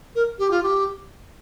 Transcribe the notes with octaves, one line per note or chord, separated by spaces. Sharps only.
A#4
G4
F4
G4